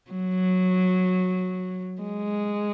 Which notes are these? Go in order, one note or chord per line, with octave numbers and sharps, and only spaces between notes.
F#3
G#3